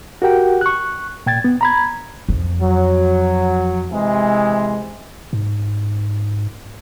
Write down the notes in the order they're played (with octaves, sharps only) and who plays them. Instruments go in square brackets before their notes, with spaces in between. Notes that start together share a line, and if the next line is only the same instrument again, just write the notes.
[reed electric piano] F#4 G4 A#4 F#5 G5
C#6 F#6
A#2 G5 G#6 A6
B3
A#5 B5 G#6
[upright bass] F2
[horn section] F#3
C3 E3 G#3
[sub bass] G#2